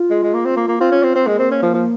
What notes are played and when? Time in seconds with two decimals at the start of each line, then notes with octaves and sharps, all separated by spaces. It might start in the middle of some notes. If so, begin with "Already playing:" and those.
Already playing: F4
0.10 G#3
0.23 G#3
0.34 A#3
0.45 C4
0.56 A#3
0.68 A#3
0.80 C4 F4
0.92 C#4
1.03 C4
1.15 C4
1.27 G#3 A#3
1.39 C4
1.51 C#4
1.63 F3
1.74 F3